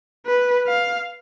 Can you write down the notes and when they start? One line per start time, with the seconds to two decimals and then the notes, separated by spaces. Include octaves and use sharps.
0.26 B4
0.67 F5